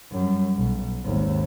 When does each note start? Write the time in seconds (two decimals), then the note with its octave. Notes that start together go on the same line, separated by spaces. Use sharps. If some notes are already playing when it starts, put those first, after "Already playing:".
0.11 F#2 G3
0.56 B1
1.04 G#1 D#2